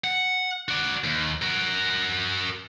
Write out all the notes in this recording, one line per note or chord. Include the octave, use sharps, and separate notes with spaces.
F#5
F#4 D5
D#2
F#4 A#4